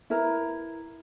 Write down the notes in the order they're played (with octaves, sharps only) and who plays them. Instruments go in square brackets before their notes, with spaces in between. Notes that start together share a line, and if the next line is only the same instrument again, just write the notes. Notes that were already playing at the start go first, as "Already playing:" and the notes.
[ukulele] E4 A#4 B4 A#5